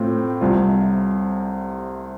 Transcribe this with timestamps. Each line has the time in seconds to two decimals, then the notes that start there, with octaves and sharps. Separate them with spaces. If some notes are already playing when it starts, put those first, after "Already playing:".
Already playing: A2 A3 C4 F4
0.41 C2 C3 G3 F4